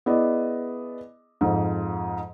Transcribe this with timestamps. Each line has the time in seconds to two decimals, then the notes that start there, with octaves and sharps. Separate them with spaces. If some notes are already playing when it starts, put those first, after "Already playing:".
0.06 B3 E4 G#4 D5 D#5
1.41 F2 G#2 F3